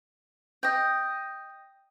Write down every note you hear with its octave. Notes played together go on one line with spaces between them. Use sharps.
D#5 G5